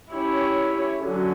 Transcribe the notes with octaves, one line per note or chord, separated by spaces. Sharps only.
C#4 E4 G4 C#5
D3 F#3 C#4